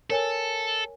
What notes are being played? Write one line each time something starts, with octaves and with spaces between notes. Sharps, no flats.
A4 A#4 C#5 G#5